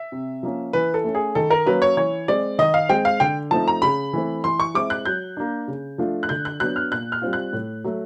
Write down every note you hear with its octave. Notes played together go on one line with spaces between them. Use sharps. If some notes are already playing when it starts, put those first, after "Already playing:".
Already playing: E5
C3
F3 A#3 C#4
E3 B4
A4
A3 C#4
G#4
D#3 A4
A#4
F#3 A#3 C#4 B4
C#5
E3 C#5
G#3 C4 D5
D#3 D#5
F5
G#3 C4 G5
F5
D3 G5
F3 A3 C4 D#4 A5
A#5
C#3 B5
E3 A3 C4
E3 C6
C#6
G#3 C4 E4 D6
F#6
F#3 G6
A#3 D4
C#3
F3 A3 D4 F4
F#6
D3 G6
F#6
F#3 B3 D4 F#6
F6
A#2 F#6
F6
G3 C4 F4
F#6
A2
F#3 A3